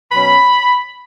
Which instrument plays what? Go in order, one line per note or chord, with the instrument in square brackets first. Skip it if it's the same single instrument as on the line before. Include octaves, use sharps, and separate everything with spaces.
[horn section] B2 F#3 C#4 B5